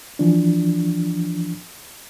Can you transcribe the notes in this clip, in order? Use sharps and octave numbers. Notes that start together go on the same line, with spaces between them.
E3 F3 D4